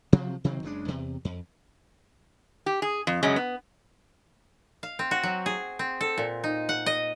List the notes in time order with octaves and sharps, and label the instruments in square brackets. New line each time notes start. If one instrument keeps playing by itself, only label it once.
[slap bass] C3 F3 F#3 C4
C3 D#3 F#3 C4
F#1 C#3 G#3 D4
E2 C3
F2
[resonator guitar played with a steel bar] G4
G#4
F2
F#2 C#3 G#3 C#4
B3
[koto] F5
C4
F#4
F#3
G#4
C4
A4
A#2
D#4
F#5
D#5